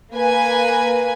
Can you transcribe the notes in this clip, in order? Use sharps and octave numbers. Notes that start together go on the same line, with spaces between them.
A#3 B4 G#5